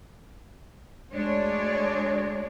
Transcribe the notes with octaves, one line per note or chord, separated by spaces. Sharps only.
D2 G#3 D4 C#5 D5